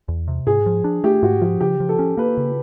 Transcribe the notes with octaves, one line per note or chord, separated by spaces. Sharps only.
E2
C3
G#2 G#4
F3
D4
A3 G4
G#2 F#4
F3 F#4
C#3 G4
F3
A4
C#4
A#3 B4
C#3